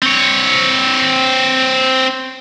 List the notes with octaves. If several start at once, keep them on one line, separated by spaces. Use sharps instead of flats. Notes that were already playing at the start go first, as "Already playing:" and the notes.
C4 C#5